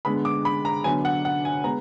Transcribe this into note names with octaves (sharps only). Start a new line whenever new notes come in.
D3 G#3 B3 B5
D6
B5
A#5
D3 F#3 B3 G#5
F#5
F#5
G#5
G#3 B3 A#5